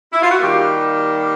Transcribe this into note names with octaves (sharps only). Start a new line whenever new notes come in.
E4
F4
F#4
D#3 G3 A#3 F4 G4